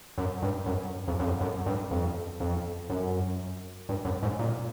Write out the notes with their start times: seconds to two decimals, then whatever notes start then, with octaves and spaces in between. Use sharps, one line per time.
0.18 F#2
0.42 G2
0.66 F#2
1.08 F2
1.20 F#2
1.25 F2
1.41 F#2
1.66 G2
1.91 F2
2.40 F2
2.90 F#2
3.89 G2
4.05 F#2
4.23 G#2
4.39 A#2